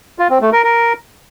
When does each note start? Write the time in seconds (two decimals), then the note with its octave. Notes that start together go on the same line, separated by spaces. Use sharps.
0.19 F4
0.30 C4
0.41 A3
0.53 A#4
0.64 A#4